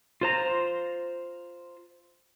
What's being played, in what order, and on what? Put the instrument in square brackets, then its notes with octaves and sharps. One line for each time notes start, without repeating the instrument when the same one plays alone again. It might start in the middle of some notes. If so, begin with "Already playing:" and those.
[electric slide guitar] F4 C5 A#5